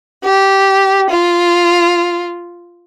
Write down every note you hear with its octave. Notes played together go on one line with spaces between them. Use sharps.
G4
F4